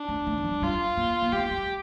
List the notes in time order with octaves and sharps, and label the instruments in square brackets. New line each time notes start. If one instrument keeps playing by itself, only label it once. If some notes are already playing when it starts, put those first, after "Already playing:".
Already playing: [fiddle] D4
[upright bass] A3
A3
F3
G3
[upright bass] G3 [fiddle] F4
[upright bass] A#3
A#3
[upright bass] A3 [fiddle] G4
[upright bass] G3